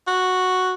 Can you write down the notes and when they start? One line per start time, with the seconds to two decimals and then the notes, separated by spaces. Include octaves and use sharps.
0.07 F#4